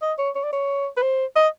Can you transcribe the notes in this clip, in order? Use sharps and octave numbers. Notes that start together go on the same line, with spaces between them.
D#5
C#5
C#5
D5
C#5
B4
C5
D#5